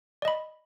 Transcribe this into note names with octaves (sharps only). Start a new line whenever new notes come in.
D5 D#5 B5